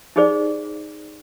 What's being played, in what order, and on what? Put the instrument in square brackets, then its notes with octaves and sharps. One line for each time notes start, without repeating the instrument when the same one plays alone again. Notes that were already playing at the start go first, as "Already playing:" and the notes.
[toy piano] D#4 G4 G#4 C5 D5